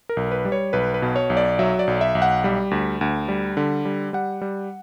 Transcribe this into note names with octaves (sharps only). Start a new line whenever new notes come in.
A#4
B1
B4
G3
C#5
B1 B4
B4
B2
C#5
B1
D5
F#3 E5
D5
B1
E5
B1
F#5
G3
D2
D2
G3
D3
G3
G3 F#5
G3